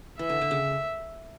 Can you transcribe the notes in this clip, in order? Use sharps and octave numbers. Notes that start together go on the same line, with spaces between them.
E3 E5
D3
D3
C#3